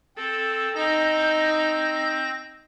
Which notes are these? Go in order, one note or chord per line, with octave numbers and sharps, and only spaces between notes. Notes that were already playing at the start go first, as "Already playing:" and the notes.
C4 A4
C4 D#4 G6 A#6